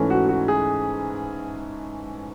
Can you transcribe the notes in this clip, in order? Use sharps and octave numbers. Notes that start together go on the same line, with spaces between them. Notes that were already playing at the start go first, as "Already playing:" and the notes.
Already playing: G#2 E3 A3 C#4
F#4
F#4
G#4